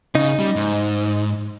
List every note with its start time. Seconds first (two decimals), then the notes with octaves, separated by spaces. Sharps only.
0.15 C#3 D#4
0.39 G3
0.56 G#2